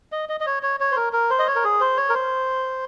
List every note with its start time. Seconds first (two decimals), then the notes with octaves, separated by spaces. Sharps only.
0.12 D#5
0.29 D#5
0.40 D#5
0.46 C#5
0.63 C#5
0.80 C#5
0.91 C5
0.96 A#4
1.13 A#4
1.30 C5
1.39 D#5
1.47 C#5
1.56 A#4
1.64 G#4
1.80 C5
1.97 C#5
2.09 A#4
2.14 C5